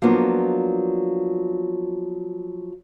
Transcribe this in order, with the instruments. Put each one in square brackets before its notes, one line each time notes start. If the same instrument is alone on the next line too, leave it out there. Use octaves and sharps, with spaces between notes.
[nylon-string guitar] F3 F#3 A#3 B3 D4 F4